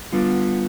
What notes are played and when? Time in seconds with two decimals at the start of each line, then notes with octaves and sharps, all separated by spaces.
0.12 D3 G3 B3 D4 F4